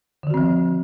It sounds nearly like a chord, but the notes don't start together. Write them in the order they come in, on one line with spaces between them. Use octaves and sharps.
D3 D#3 F#4 C4 F3